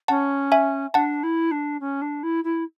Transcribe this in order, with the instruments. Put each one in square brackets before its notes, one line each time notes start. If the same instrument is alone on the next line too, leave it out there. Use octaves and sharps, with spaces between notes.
[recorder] C#4 [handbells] F#5 A5
[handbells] E5 G#5
[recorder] D4 [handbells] F#5 A5
[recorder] E4
D4
C#4
D4
E4
E4